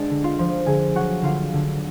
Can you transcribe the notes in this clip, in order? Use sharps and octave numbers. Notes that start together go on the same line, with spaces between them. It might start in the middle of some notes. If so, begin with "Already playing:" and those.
Already playing: G#3 B3 D4 D5
D3
F4 F5
F3
D3 G#4 G#5
F#3 F#4 F#5
D3 F4 F5
D3